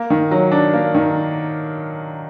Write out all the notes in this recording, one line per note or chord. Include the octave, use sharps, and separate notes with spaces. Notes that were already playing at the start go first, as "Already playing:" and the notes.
Already playing: A#3
D#3
F#3
D4
A#3
D#3